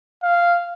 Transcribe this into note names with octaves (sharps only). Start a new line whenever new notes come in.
F5